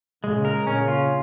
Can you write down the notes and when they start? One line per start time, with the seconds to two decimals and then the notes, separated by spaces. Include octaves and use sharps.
0.23 A#2 C#3 G#3
0.45 A#4
0.66 A#2 C#3 C#4
0.88 F4